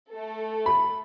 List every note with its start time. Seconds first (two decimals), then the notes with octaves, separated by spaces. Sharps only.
0.10 A3 A4
0.66 B5